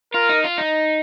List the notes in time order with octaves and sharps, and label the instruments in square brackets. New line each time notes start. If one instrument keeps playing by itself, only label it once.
[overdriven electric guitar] F4 [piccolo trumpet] A#4
[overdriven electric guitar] D#4
F4
D#4